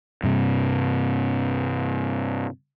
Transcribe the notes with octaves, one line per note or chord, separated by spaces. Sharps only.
G2 C3